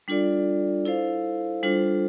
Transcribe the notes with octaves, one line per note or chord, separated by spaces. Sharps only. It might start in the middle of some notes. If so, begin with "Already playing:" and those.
G3 D4 F4 A4 D5
E4 A4 C5 F5
G3 D4 F4 A4 C5